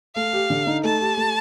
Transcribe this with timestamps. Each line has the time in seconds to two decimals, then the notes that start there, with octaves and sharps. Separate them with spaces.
0.15 A3 F5
0.33 G4
0.50 D3
0.67 D#4
0.84 A3 A5
1.01 G4
1.17 A3